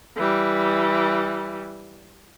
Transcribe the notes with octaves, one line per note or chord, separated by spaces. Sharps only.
E3 G3